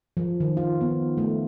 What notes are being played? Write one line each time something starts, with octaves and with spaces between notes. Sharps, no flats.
F3
D#3
F4
B3
A3